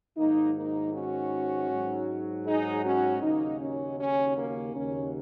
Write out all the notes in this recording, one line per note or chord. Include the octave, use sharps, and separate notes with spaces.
G#2 D#3 F#3 A#3 D#4
A#3 D#4
C#4 F#4
G#2 F#3
D#4 G#4
C#4 F#4
D#2 C#3 F#3 A#3 D#4
C#4
C#4
A#3
D#2 C#3 F#3 C#4